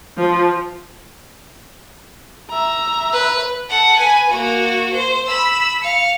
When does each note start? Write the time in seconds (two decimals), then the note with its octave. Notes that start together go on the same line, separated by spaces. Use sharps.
0.17 F3
2.50 E5 A#5
3.13 B4
3.70 A4 F#5
3.98 B4 G#5
4.29 A#3 F#4
4.93 C5
5.26 B5 E6
5.83 F5 C#7